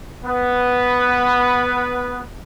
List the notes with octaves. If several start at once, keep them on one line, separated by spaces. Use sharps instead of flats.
B3 B4